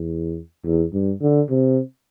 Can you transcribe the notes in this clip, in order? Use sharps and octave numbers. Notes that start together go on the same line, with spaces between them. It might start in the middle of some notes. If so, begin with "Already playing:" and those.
Already playing: E2
E2
G2
D3
C3